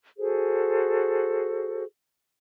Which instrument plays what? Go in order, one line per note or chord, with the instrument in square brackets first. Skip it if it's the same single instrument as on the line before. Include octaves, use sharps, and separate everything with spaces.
[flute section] F#4 G#4 A4 C5